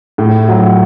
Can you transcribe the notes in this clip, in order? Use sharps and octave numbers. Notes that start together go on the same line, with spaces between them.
A2
F#3